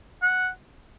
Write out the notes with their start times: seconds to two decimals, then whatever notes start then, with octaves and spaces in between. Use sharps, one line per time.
0.22 F#5